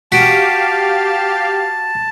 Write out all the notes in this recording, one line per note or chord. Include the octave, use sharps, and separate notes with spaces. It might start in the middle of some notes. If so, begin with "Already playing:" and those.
F#4 G4 F5 A5 B6 D7